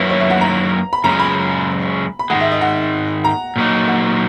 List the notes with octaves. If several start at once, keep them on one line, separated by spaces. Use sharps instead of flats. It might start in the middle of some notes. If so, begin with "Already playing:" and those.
Already playing: F#2 D#3 F#3 A#3 E4 B4
C#5
E5
F#5
A#5
B5
F#2 C#3 G#3 A#5
B5
B5
G#2 D#3 G#3 F#5
E5
D#5
F#5
A#5
A#2 F#3 A#3 D#4
F#5